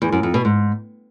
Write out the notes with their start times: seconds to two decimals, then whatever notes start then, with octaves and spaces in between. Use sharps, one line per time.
0.02 E2
0.12 F#2
0.23 F2
0.34 B2
0.45 G#2